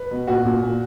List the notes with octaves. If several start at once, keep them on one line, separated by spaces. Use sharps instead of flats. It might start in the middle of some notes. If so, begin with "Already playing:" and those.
Already playing: B4
B2
A#2 F#4
A#2
A#2